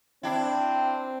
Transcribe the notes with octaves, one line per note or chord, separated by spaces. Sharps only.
C4 D4 E4 G5